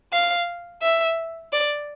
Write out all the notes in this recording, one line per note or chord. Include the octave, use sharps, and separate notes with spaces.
F5
E5
D5